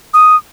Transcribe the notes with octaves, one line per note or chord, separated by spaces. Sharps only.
D#6